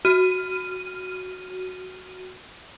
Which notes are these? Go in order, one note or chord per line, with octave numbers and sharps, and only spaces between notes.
F#4 F6 D#7